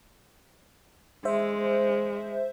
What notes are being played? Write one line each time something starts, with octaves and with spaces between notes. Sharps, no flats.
G#3 C5 E5